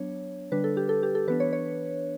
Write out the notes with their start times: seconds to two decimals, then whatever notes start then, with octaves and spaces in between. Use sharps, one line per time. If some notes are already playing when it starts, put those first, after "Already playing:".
Already playing: F#3 B3 D4 C#5
0.52 D3 G3 D4 B4
0.64 A4
0.77 G4
0.89 A4
1.03 G4
1.15 A4
1.28 E3 B3 D4 B4
1.40 C#5
1.53 C#5